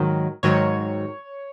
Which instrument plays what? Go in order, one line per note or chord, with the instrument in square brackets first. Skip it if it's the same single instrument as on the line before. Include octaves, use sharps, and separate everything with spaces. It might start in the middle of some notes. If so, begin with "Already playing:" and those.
Already playing: [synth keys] G#2 D#3 F#3
G#2 D#3 F#3 C#5